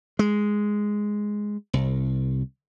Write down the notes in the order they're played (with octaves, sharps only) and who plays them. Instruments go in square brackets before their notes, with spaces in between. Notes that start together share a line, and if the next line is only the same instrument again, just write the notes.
[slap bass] G#3
C2